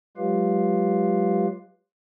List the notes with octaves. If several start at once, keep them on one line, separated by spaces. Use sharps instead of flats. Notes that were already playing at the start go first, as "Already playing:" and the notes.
F#3 G#3 F4 G4 B4 F5